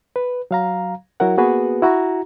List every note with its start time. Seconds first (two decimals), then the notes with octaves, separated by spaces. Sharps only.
0.16 B4
0.51 F#3 F5 A#5
1.20 F#3 E4 F#4 A#4 F#5
1.37 A#3 B3 F#4 G#4 B4
1.82 E4 F#4 A#5